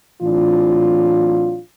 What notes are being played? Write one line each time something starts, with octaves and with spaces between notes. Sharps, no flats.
A2 E3 F#3 C4 D4 F4